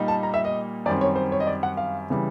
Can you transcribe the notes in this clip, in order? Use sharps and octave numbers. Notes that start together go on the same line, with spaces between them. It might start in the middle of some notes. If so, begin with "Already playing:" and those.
Already playing: A#2 G3 A#3 D#4
A5
A#5
E5
D#5
F#2 D#3 G3 C4 D5
C#5
C5
C#5
D#5
D5
F#5
F5
C#3 E3 G3